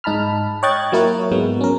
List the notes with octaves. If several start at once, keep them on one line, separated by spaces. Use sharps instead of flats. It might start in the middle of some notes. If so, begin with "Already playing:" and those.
G#2 D#4 A5 B5 F6
C#5 D#5 G5 F#6 G#6 A6
F#3 A#3 E4 A#4 C#5
G#2 F#3 G#3 B3
C#4 A#4